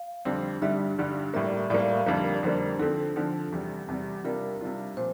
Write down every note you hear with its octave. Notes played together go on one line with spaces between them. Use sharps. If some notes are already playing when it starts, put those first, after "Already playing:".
Already playing: F5
F2 D3 G3 C4
G2 D3 G3 E5
G2 D3 G3
A2 G3 A#3 E5
D5
E5
A2 G3 A#3 D5
F5
E5
F5
F2 D3 G3 A#3 E5
D5
F2 D3 G3 A#3 C5
D3 F3 C4 A4
D3 F3 C4
E2 C3 G3
E2 C3 G3
C3 G3 D4 F4 A#4
C3 G3 D4 F4
A#2 F3 C5